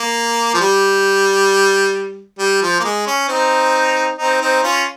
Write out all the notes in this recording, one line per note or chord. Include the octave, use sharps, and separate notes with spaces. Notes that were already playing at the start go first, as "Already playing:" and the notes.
Already playing: A#3
F3
G3
G3
F3
A#3
G#3
C#4
C4 D#4
C4 D#4
C4 D#4
C#4 F4